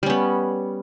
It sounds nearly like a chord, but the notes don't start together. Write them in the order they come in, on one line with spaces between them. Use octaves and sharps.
G3 C#4 B3